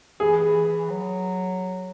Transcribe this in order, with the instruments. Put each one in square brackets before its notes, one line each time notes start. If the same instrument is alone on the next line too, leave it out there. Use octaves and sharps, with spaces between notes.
[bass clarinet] E3 [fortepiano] G#4
[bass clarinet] E3
E3
F#3